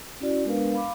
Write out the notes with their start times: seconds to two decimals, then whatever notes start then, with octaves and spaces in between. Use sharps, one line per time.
0.20 C#4 E4 F#4 D5
0.45 G#3 B3 D4 A#4 B4 F5
0.73 F5 B5 D6